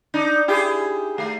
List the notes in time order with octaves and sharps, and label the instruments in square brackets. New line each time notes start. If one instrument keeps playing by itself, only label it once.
[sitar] D4 D#4
E4 G4 G#4
A3